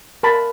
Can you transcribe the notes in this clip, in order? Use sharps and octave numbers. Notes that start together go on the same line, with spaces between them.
A#4 A5 B5